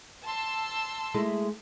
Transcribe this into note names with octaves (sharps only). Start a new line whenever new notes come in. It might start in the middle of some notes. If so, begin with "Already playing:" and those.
A5 C6 E6
G#3 A3 E4